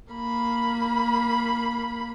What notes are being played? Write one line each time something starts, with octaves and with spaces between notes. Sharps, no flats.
A#3 B5